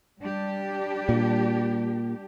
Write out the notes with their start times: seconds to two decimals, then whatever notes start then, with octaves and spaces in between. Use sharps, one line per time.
0.22 G3 D4 G4
1.09 A#2